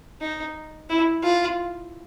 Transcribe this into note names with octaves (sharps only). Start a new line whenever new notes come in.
D#4
E4
F4